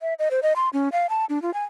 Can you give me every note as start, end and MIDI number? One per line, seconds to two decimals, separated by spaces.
0.01 0.14 76
0.19 0.29 75
0.31 0.40 72
0.43 0.53 75
0.56 0.69 84
0.73 0.89 61
0.92 1.07 77
1.10 1.25 81
1.29 1.41 62
1.42 1.53 65
1.54 1.63 80